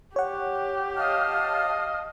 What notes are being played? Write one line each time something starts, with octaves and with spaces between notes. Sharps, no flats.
G4 C#5 F#5
D#5 F5 A5 F6